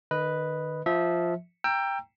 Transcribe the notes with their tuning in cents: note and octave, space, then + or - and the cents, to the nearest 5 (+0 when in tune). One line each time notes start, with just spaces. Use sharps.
D#3 -40 B4 +0 D#5 +0
F3 +0 E5 -25
G5 +15 A#5 +0 E6 +25